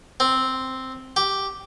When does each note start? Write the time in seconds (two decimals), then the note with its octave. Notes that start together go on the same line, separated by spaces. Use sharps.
0.20 C4
1.16 G4